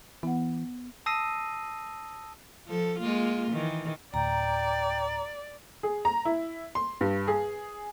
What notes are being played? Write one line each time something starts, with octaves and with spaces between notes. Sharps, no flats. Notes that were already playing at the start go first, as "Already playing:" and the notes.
E3 B3 F#5
A5 D#6 E6 A#6 C7 D#7
F3 A4
G#3 A#3 F4
D#3 E3
D2 A2 D5 G5 A#5
G#4
A#5
E4
C6
G2
G#4